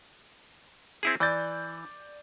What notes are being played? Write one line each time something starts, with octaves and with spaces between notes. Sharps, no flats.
C4 E4 G#4
E3 D5 G6 A6